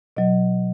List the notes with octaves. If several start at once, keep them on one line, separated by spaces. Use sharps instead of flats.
B2 F#3 D#5